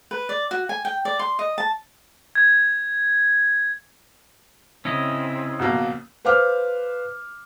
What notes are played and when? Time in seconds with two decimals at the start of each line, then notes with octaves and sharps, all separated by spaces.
0.11 B4
0.29 D5
0.51 F#4
0.69 G#5
0.85 G5
1.05 D5
1.19 C6
1.39 D#5
1.58 A5
2.35 G#6
4.85 C#3 C4 C#4 E4 D#5
5.59 A#1 B2 A#3
6.25 B4 C5 F5 D6 F6